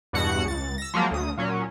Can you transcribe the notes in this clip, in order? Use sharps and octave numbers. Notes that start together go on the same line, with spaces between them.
E2 G2 B2 F#4 F#5 C#7
C#2 A6
E6 A#6
F3 F#3 G#3 A#3
D2 D#6
A#2 F#3 C#4